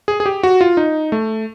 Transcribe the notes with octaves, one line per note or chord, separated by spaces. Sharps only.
G#4
G#4
G4
F#4
F4
D#4
A3